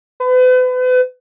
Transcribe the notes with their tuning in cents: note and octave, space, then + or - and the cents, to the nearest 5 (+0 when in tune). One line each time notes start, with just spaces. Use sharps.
B4 +40